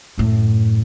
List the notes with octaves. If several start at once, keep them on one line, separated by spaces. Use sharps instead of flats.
F#2 A2